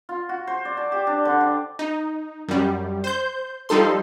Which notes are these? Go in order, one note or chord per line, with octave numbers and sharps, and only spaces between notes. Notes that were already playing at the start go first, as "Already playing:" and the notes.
F4
F#4
C5
D5
A5
G4
D4
D3
D5
D#4
F#2 G3
C5 G6
F3 G3 D#4 A4 C6